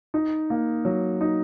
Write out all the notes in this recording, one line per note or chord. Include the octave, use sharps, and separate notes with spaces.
D#4
A#3
F#3
D#4